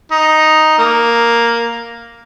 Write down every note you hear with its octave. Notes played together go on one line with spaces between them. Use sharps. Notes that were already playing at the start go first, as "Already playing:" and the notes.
D#4
A#3